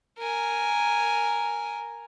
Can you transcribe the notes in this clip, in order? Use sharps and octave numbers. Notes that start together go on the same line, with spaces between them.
A#4 G#5